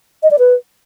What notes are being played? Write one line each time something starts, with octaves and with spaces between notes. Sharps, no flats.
D#5
D5
B4